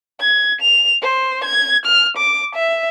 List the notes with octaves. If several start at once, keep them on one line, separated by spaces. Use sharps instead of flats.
G#6
F7
C5
G#6
F6
D6
E5